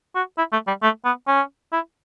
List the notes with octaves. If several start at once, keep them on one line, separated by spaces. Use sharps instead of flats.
F#4
E4
A3
G3
A3
B3
C#4
E4